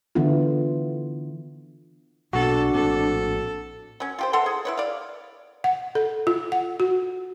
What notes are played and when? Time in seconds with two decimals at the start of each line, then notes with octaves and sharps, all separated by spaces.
0.15 D3 E3 B3 E4 F4
2.33 B1 B2 A#3 D4 F#4 A4
2.75 A#1 A2 C4 A4
4.00 F#3 C#4
4.19 F4 G4 C5
4.33 E3 A4 F#5 C6
4.46 G#4
4.65 E4 B4 C#5
4.78 D5 F5
5.64 F#5
5.95 A4
6.27 F4
6.52 F#5
6.80 F#4